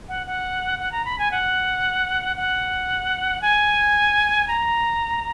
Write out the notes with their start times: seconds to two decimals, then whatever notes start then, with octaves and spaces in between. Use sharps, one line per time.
0.09 F#5
0.27 F#5
0.79 F#5
0.92 A#5
1.05 B5
1.19 G#5
1.31 F#5
2.36 F#5
3.42 G#5
4.48 A#5